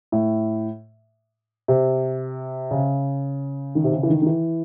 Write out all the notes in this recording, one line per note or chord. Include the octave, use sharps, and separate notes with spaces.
A2
C3
C#3
D#3
C3
C#3
E3
D#3
D#3
E3